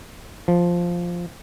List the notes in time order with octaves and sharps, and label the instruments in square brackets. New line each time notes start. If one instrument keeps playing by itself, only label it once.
[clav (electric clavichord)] F3